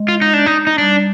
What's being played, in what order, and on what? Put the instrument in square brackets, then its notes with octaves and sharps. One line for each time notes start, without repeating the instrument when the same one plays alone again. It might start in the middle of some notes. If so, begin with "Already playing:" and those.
Already playing: [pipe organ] G#3
[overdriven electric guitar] F4
D#4
D4
D#4
D#4
[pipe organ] G3 [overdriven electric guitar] D4